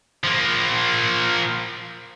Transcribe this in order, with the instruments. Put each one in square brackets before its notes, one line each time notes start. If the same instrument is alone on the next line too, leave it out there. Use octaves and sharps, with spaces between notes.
[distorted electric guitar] F3 A#3